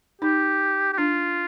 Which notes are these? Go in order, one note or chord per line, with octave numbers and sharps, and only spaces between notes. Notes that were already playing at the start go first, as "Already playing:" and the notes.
D#4 G4
G4
D4 F4